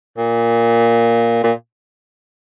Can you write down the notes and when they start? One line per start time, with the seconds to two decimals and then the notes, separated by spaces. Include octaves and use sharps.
0.18 A#2
1.43 A#2